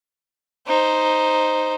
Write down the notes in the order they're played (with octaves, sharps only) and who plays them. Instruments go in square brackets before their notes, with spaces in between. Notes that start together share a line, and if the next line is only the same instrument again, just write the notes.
[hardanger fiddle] D#4 C5